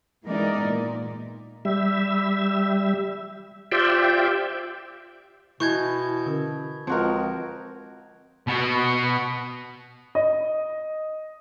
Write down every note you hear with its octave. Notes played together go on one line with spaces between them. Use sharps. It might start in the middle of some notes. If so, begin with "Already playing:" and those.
E3 G#3 B3 D#4 A#4 D5
A#2
G3 E5
F4 G4 C5 D5 E5 G5
B2 E3 C#6 G6 G#6
D3 C#4 A#4
C#2 F3 C4 F#4 A#4
B2 F#4
D#5